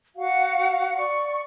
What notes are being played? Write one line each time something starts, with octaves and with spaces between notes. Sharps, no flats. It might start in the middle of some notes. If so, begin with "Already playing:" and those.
F#4 F5 F#5
D5 C#6